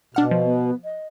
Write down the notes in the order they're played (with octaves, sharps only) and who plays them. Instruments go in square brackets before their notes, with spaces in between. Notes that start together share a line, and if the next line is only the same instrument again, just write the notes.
[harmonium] B2 [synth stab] D4 F#5 F6
[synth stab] F3
[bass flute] B3
D#5